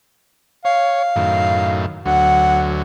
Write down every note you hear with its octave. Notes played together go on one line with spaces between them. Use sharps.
C#5 F5
F#2 A2 D#3
D2 F#3 F#5